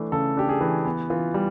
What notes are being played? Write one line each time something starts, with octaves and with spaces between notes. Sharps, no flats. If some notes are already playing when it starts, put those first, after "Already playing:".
Already playing: E3 A3 D4
C#3 A4
D4 G4
G#4
E3
B3
E3 F4
G3